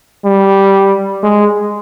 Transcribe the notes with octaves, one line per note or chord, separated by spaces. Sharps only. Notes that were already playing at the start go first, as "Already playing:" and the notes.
G3
G#3